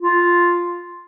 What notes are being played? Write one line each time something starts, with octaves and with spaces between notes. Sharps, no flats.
F4